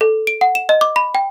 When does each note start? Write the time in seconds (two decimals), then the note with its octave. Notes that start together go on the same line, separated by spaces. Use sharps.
0.01 A4
0.27 D7
0.41 F#5
0.55 E7
0.69 D#5
0.81 D6
0.96 B5
1.15 G5